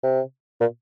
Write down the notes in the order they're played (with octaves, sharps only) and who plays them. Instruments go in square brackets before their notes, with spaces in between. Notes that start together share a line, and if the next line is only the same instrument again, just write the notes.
[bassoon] C3
A#2